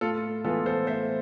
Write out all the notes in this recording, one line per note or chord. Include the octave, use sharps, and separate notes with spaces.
A2 F4 A4
E3 G#3 B3 F4 A4
A4 C5
A2 C5 E5